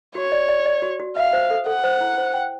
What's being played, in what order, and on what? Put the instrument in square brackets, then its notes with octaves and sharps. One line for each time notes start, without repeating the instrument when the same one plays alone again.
[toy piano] F#4 [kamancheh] C#5
[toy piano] D5
D5
D5
F#4
F#4
[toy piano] E5 [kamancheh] F5
[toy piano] C5
A4
[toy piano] A4 [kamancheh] F#5
[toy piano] C5
E4
C5
G5